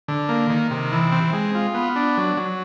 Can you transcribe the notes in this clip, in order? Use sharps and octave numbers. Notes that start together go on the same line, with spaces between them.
D3
A#3
D#3
C3
E3
C4
G#3
F4
B3
D4
F#3
F#3